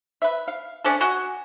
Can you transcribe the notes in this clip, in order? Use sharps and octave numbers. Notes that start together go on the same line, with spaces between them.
B4 E5
F5
A3 C#4 D4 A4
F#4 D#5 F#5 G#5